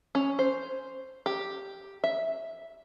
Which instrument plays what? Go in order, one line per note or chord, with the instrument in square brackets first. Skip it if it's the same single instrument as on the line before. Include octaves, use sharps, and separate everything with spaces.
[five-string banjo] C#4
C5
G4
E5